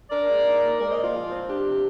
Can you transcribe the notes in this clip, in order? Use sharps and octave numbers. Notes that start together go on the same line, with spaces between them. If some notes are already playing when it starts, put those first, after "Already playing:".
D4 A#4 D5
G#3
D#4
A#3
G#3 A#4 D5
C5 D#5
A#2
F4
F3
C4
D4 G4
C3